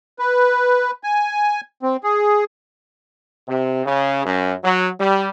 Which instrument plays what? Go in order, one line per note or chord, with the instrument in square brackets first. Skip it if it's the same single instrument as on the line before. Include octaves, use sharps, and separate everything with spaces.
[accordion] B4
G#5
C4
G#4
[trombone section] C3
C#3
F#2
F#3
G3